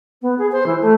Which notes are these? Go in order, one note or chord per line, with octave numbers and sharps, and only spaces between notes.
B3
G#4
C5
E3
A3